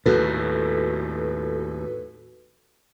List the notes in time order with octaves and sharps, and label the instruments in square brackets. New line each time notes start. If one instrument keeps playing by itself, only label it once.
[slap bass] D#2 A2 [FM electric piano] F#4 A4 B4